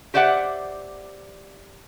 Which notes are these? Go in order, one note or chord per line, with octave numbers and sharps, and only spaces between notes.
G4 C5 D5 E5 F#5